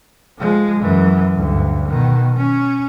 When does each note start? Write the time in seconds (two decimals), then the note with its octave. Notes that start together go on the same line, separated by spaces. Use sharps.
0.39 F3 G#3
0.80 F#2 E3
1.36 D2 G2
1.89 B2 D#3
2.37 C#4